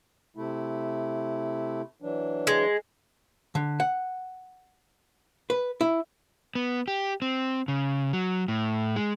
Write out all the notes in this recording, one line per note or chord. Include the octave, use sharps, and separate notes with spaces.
C3 A3 E4
E3 F#3 D4
G#3
D3
F#5
B4
E4
B3
G4
C4
C#3
F#3
A2
G#3